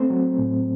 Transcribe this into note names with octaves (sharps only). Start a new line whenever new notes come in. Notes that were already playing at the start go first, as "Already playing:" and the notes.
Already playing: A3 C4 C5
F#3
A2